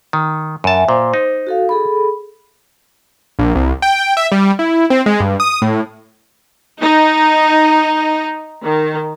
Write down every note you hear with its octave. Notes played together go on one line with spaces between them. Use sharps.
D#3
F#2 E5 G#5 A5
A#2 C5
D#4
F#4 A4 F5
G#4 A4 B5
A#1
C2
G5
E5
G3
E4
C4
G#3
G2
D#6
A2
D#4
D#3